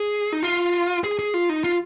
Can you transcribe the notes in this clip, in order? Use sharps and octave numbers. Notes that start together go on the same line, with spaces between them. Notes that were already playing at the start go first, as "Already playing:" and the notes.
Already playing: G#4
D#4
F4
G#4
G#4
F4
D#4
F4